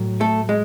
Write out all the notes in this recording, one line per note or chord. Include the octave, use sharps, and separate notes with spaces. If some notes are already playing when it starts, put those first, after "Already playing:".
Already playing: A2 F#3
A3 A4
G#3